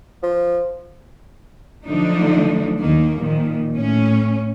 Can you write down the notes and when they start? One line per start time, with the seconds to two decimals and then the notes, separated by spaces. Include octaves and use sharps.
0.22 F3
1.86 D3 F3 F#3 A3 D4 D#4
2.78 D#2 D#3 A#3
3.19 A#2 D#3 F3
3.75 A2 C#4